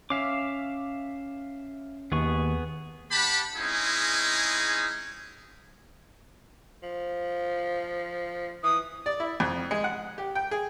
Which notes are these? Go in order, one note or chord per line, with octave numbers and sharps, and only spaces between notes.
C#4 E5 F5 D6
D#2 B3 G#4 C#6
D4 G4 F#5 A5 B5
G#3 C4 C#4 D#4 E4 G#4
F3
E3 D#6
D5
E4
F2
G#3
F#5
G4
G5
G#4